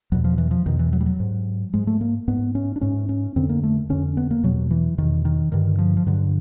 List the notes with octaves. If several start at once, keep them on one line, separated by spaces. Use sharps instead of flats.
E2 B2 F#3
F3
E3
F3
E2 B2 D#3
E3
F#3
G3
F#3
G#2
G#2 G#3
A3
A#3
G#2 B3
C#4
D4
G#2 C#4
C#4
F2 D3 C4
A#3
A3
F2 D3 C#4
B3
A#3
E2 B2 F#3
E3
E2 B2 D#3
D#3
G2 D3 D#3
F3
F3
G2 D3 F#3